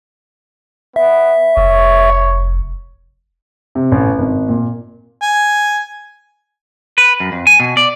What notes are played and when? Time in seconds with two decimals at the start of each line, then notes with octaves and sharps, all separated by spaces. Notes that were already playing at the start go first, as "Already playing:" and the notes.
0.96 B3 E5
1.57 F1 C#5
3.75 C3
3.92 A1
4.18 G#1
4.49 A#2
5.22 G#5
6.98 B4
7.20 F#2
7.32 F2
7.47 G#5
7.60 B2
7.77 D5